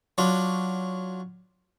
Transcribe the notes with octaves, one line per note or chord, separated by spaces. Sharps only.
F#3 D4 F4